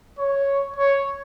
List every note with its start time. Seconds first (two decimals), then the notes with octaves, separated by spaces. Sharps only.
0.19 C#5
0.76 C#5